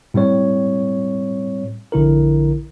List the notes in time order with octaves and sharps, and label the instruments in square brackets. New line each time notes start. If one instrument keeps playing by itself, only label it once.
[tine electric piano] A2 G3 C4 C#5
A#1 D3 E4 A#4